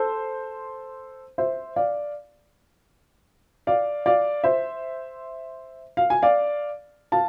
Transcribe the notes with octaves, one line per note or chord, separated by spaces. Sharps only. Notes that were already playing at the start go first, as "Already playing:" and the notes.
Already playing: A4 C5
C5 E5
D5 F5
D5 F5
D5 F5
C5 E5
F5
G#5
D5 F5
F5 A5